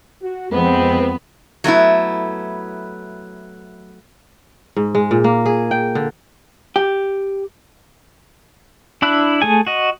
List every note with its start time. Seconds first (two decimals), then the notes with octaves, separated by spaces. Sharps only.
0.21 F#4
0.52 F2 G#3 B3 C4
1.64 F#3 A3 B3 E4
4.76 G#2
4.95 G#3
5.11 A#2
5.24 A#3
5.46 G#4
5.71 G5
5.95 D3
6.76 G4
9.02 D4 E4 B5 E6 F#6
9.42 A3 G#4 G#5
9.67 F#4 D#5